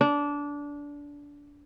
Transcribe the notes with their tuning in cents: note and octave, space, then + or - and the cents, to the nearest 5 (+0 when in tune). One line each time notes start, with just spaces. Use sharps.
D4 -20